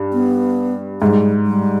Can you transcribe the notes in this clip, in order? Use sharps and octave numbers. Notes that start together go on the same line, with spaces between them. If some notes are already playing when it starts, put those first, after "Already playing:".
Already playing: G2
B3
G#2 G3
G3